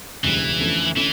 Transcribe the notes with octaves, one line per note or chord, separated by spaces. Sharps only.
E1 D2 C#3 E3 G3
F2 D3 A3 C#4
D3 E3 A3 C#4